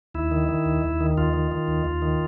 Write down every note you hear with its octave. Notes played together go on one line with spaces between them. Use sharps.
D#2 E4
D#3
D#3
D#2
D#2
D#3
D#2 F4
D#3
D#3
D#2
D#2
D#3